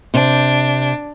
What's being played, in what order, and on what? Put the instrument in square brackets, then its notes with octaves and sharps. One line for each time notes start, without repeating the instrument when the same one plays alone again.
[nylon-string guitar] C3 [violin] D4